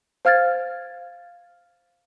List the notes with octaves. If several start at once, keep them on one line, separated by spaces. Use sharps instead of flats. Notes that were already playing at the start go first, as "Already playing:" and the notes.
C5 F5 F6 G#6 A6